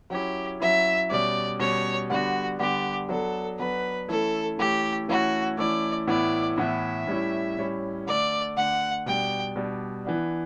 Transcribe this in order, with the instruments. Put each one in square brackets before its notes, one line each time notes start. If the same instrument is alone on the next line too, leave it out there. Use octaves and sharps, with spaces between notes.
[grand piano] F#3 C#4 E4 [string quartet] G4
[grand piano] F#3 C#4 E4 [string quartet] E5
[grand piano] B2 G3 C#4 [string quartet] D5
[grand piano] B2 G3 C#4 [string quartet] C#5
[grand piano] D3 G3 B3 D4 [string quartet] F#4
[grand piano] D3 G3 B3 D4 [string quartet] G4
[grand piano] F#3 B3 D4 [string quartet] A4
[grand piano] F#3 B3 D4 [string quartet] B4
[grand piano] E3 A3 C#4 E4 [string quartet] A4
[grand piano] E3 A3 C#4 E4 [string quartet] G4
[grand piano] E3 A3 C#4 E4 [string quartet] F#4
[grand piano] E3 A3 C#4 E4 [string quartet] D5
[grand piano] A2 E3 B3 E4 [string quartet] D5
[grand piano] A2 E3 B3 E4 [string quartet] E5
[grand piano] A2 G3 C#4 E4
A2 G3 C#4 E4
[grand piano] D3 A3 D4 [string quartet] D5
[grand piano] D3 A3 D4 [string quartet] F#5
[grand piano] B2 G3 D4 [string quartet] G5
[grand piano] B2 G3 D4
E3 B3 D4